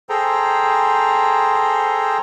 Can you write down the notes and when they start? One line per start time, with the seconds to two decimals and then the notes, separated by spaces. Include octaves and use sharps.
0.09 G#4 A4 C5 G5 A#5